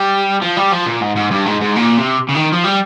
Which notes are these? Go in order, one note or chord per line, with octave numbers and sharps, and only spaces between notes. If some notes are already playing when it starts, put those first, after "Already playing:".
Already playing: G3
F3
G3
F3
A#2
G#2
G#2
G2
G#2
G#2
A#2
C3
C#3
D#3
F3
G3